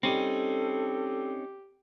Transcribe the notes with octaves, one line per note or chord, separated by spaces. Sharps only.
G3 C4 C#4 D#4 G4 A4